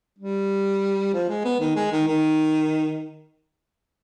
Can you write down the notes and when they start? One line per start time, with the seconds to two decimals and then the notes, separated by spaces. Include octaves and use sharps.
0.19 G3
1.13 F3
1.29 G#3
1.44 B3
1.60 D#3
1.76 G#3
1.92 D#3
2.08 D#3